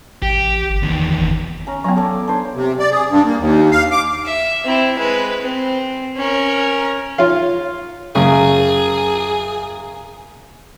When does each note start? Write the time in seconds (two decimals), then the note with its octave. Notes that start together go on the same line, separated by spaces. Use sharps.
0.22 A1 G4
0.70 G1
0.83 E2 D#3
1.67 C#4 A#5
1.84 F#3 B3 F5 G#5 A#5
1.96 A4 D5
2.28 D4 C5 C#5
2.55 C3
2.79 D5
2.91 G#4
3.10 G2
3.25 A#3
3.38 D#2
3.71 F5
3.91 D6
4.26 E5
4.65 C4 E4
4.99 G#3 B4
5.42 C4
6.17 C#4 A#4
7.18 F4 C#5 F5
8.15 F#2 C#3 G#4